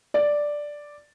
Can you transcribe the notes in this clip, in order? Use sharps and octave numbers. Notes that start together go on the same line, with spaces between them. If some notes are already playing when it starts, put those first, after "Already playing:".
D5